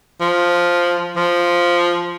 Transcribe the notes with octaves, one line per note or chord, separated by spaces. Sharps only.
F3
F3